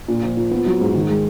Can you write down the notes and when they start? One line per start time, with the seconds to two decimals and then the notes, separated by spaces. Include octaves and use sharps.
0.08 A#2
0.23 F3
0.37 F3
0.51 B3
0.66 F#3
0.81 G#2
0.95 D#3
1.09 G#3